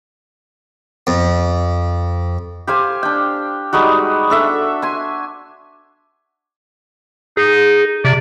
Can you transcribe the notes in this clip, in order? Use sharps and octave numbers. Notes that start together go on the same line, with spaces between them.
F2
G4 C5 F5 G#5
D4 G5
G3 G#3 D#4 F#4
D4 A4 E5
G#5 C6
D#4 G#4
C3 D5